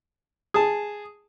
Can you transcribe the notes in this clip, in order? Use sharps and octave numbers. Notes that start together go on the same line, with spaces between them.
G#4 A5